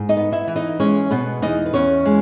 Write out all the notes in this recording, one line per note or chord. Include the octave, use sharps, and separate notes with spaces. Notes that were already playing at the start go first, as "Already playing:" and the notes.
Already playing: G#2
D#4 D#5
B3
E4 E5
E3
D#4 D#5
G#3 C#4 C#5
B2 B3 B4
E2 D#4 D#5
B4
E2 C#4 C#5
G#3